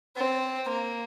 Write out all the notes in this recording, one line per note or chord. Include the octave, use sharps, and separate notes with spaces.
C4
A#3